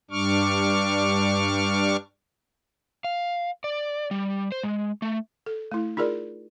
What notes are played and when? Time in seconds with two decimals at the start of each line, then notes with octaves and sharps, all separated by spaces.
0.11 G2 G3 D4 C#6 D6 F6
3.04 F5
3.64 D5
4.11 G3
4.52 C5
4.63 G#3
5.02 A3
5.46 A4
5.71 A3 E4
5.97 D#4 F4 G#4 A#4 D5